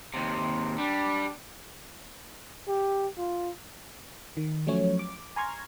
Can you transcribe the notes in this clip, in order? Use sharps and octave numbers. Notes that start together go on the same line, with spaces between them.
D#2 C3
G3 D4
G4
F4
D#3
F3 F#3 A3 C#4 C#5
D6
G#5 A#5 C6 C#6 F6 G#6